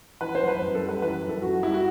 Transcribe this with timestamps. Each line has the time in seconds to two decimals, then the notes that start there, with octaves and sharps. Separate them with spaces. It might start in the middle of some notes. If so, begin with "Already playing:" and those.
0.21 E3 B4
0.35 C5
0.42 F#2
0.48 B4
0.62 F#2
0.75 A4
0.82 G3
0.89 B4
1.02 E3 B4
1.22 F#2
1.29 A4
1.42 F#2 F#4
1.62 G3 E4
1.74 F#4